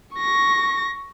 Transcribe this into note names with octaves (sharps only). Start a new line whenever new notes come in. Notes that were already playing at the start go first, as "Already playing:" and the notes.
C#6 A#6